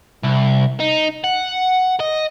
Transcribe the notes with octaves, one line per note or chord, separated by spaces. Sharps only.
C2
D#4
F#5
D#5